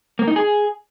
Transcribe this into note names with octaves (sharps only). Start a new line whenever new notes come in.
A#3
D#4
G#4